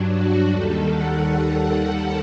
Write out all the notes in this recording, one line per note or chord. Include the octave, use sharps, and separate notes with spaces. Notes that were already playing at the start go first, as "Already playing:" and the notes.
Already playing: G2 F#3 D4
F#4
D#2 D#3 G3 A4
F#5